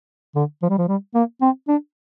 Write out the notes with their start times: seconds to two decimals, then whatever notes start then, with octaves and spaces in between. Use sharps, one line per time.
0.35 D3
0.62 F3
0.69 G3
0.78 F3
0.88 G3
1.15 A#3
1.41 C4
1.68 D4